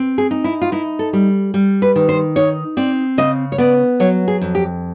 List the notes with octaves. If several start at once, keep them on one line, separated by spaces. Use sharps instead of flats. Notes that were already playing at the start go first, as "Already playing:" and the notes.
Already playing: C4
G#4
D#4
E4
F4
D#4 E4
A4
G3
G3
B4
D#3
C5
D#4 C#5
C4 D5
C#3 D#5
C#5
B3 D5
F#3 C#5
G#4
F2
G4